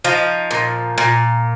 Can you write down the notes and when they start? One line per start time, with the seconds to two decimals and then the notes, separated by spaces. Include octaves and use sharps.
0.04 F3 D#4
0.51 A#2
0.98 A#2